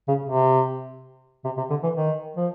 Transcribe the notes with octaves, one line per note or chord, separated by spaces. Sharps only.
C#3
C3
C3
C3
D3
E3
D#3
F3